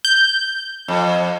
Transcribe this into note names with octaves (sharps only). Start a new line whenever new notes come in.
G6
F2